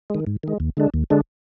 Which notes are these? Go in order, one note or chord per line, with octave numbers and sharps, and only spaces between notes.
D#3 G#3
G#2
D#3 G#3
D#2
D3 G#3 D4
D#2
D3 G#3 D4